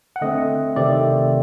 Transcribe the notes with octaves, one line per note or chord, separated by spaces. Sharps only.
F#5
D3 A3 C4 D#5
C3 D#3 A3 C4 D5